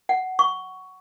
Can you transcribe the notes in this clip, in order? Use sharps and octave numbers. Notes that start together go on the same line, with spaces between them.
F#5
C#6